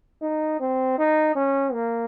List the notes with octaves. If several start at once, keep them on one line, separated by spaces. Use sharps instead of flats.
D#4
C4
D#4
C#4
A#3